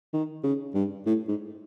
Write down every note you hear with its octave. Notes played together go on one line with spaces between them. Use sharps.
D#3
C#3
G2
A2
G#2